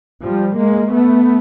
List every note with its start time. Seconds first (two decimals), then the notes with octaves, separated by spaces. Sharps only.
0.24 F3 G3
0.59 G#3 A#3
0.92 A3 B3